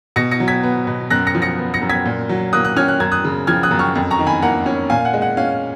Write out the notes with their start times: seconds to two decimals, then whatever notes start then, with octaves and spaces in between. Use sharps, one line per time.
0.16 B2 A#6 C#7
0.31 A#6 C#7
0.40 F#3
0.48 G#6 B6
0.63 B3
0.87 B2
1.10 F#2 F#6 A#6
1.27 A#6 C#7
1.35 F3
1.42 A#6 C#7
1.58 B3
1.74 A#6 C#7
1.82 F#2
1.90 G#6 B6
2.06 A#2
2.29 F#3
2.53 A#3 D#6 F#6
2.64 D#6 F#6
2.76 C#4 F6 G#6
2.88 F#6
3.00 F#2 G#6
3.12 D#6 F#6
3.24 C#3
3.47 F3 F6 G#6
3.63 D#6 F#6
3.71 F#2
3.79 C#6 F6
3.95 F2
4.11 A#5 C#6
4.19 D#3
4.27 G#5 B5
4.42 A#3 F#5 A#5
4.66 C#4
4.90 A#2 F5 G#5
5.05 F#5
5.14 G#3
5.22 F#5
5.37 C#4 F5